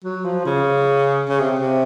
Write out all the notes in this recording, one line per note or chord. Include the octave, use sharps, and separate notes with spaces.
F#3
F3
C#3
C#3
C3
C3